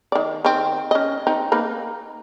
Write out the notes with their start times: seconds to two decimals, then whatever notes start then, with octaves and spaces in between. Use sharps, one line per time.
0.12 D#3 D5
0.45 D#3 C4
0.91 C#4 D#5
1.27 C4 D#4
1.52 A#3 D#4 B4